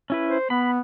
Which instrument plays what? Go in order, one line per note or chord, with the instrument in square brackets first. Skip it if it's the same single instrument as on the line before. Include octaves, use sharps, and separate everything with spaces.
[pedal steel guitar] C#4 E4 B4
[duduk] C5
[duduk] B3 [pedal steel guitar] B5